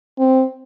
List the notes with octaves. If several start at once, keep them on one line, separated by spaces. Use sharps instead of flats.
C4